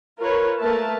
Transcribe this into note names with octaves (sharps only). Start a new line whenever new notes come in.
F4 A#4 B4 C#5
A3 A#3 A#4 B4 E5 A5